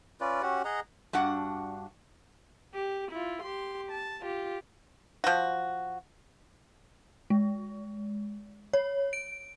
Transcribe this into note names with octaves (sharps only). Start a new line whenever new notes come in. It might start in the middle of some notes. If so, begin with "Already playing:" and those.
C#4 F4 B4 D5
C#4 F#4 G4 F#5
G#4 D#5 F#5 A#5
G2 D4 F#4 F#5
G4
E4 F4
G4 C6
A5
F4 G4
F3 F#4
G#3
C#5
D7